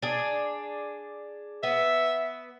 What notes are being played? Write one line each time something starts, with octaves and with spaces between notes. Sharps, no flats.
D4 G#4
B3 E5